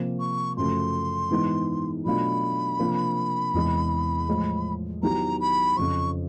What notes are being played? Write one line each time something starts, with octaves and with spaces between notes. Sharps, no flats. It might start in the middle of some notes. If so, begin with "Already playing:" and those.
Already playing: C3 F3 A#3
C#6
F#2 C#3 F3 A3 C6
G#2 E3 G#3 B3 E4
B2 F#3 A3 D4 F4 B5
C3 F3 A#3 D4 F4
E2 C3 E3 G#3
A2 F3 G#3
D#3 F#3 B3 E4 G4 A#5
B5
F2 C#3 F3 C#6